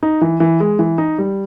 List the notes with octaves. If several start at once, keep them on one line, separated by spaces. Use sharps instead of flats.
D#4
E3
E3
G#3
E3
D#4
G3